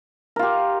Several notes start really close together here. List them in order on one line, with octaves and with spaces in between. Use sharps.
A#4 F4 G4